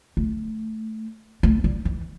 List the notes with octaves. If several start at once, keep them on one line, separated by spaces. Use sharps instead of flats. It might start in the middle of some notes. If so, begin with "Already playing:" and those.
A3
A3
G3
E3